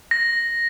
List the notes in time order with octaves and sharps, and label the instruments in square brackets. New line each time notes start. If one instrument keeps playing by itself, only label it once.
[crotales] A#6